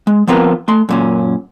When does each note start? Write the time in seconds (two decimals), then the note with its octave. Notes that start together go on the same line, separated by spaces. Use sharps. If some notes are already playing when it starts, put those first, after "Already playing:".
0.07 G#3
0.27 F3 B3 C4 F4 A#4 B4
0.68 A3 C6
0.89 F#2 A#2 C#4